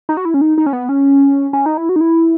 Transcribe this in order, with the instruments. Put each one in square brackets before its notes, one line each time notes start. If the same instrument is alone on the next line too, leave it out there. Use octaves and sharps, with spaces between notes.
[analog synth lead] D#4
F#4
E4
C#4
D#4
D#4
C#4
B3
C#4
C#4
D#4
E4
F#4
D#4
E4